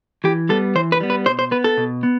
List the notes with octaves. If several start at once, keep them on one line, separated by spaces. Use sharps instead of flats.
E3 G4
G3 B3 A4
E3 C5
B4
G3 B3
B4
B2 C5
C5
B3 B4
A4
B2
B3